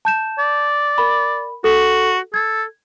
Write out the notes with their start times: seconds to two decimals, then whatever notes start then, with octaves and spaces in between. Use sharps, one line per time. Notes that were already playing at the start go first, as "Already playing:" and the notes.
0.05 A5 G6 E7
0.39 D5
0.98 A#4 B5
1.64 F#4 A4
2.34 A4 G#6